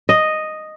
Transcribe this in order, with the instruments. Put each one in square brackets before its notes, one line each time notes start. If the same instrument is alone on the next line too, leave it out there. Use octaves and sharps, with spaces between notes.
[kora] D#5